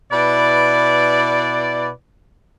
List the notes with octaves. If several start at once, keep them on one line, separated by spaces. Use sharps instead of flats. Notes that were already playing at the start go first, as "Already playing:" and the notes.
B2 E4 B4 D5